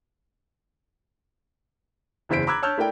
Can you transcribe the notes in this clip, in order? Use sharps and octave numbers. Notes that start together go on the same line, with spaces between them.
F#1 E2 E4 C5 B6 D7
A#5 B5 D6 E6 F#6 G#6
C#5 A5 E6 F6 G6
A3 E4 A#4 D5 G5